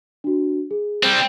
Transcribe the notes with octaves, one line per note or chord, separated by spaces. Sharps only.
D4 F#4
G#4
G3 C4